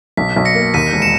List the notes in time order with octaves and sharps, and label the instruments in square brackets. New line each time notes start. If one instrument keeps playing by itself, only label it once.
[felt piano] B1 [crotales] B6
[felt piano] B1
[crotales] A#6 C#7
[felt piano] A#3
[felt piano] D#2 [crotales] B6 D#7
[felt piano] E1
[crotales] C#7 E7